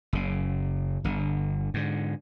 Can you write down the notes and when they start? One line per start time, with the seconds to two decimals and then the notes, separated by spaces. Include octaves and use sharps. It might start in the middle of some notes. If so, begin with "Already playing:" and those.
0.13 F#1 C#3
1.04 G1 D3
1.74 G#2 D3